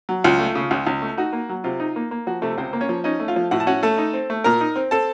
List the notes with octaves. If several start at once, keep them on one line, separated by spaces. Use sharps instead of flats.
F#3
C#2 F4
A3
C#3
C#2
C#2
A3
D#4 F#4
A#3
F#3
C3 F4
D#4
A#3
A#3
F3 F#4
C3 A3 A4
C#2 C4 C5
A#3
C#4 C#5
F3
C#4 D#4 D#5
A3
F4 F5
F3
A2 F#4 F#5
A5
C#4 F#4 F#5
A3 A4 A5
D#4
C4
A3
A#2 A#4 A#5
D#4
C4
C4 A4 A5